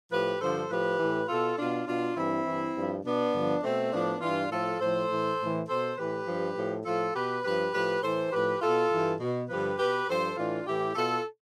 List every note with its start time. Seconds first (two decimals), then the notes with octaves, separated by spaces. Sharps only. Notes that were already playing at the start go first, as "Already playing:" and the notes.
0.11 A2 F3 G4 B4
0.40 G2 D3 F3 A4 C5
0.70 A2 F3 G4 B4
0.99 A2 E3
1.28 B2 F4 A4
1.57 B2 D4 F4
1.87 B2 D4 F4
2.16 G2 E3 C4 E4
2.46 G2 E3
2.75 G2 F3
3.04 B2 B3 D4
3.33 G2 D3 F3
3.63 B2 A3 C4
3.92 A2 F3 B3 D4
4.21 G2 E3 D4 F4
4.50 A2 F3 F4 A4
4.80 A2 F3 A4 C5
5.09 A2 E3
5.39 A2 E3
5.68 B2 A4 C5
5.97 A2 E3 G4 B4
6.26 G2 F3
6.57 A2 F3
6.85 A2 F3 F4 A4
7.14 B2 G4 B4
7.44 G2 F3 G4 B4
7.73 A2 F3 G4 B4
8.02 A2 E3 A4 C5
8.31 A2 F3 G4 B4
8.61 B2 F4 A4
8.91 G2 E3
9.20 B2
9.49 G2 D3 F3 G4 B4
9.78 B2 G4 B4
10.08 G2 F3 A4 C5
10.37 A2 E3 D4 F4
10.67 A2 E3 E4 G4
10.95 B2 F4 A4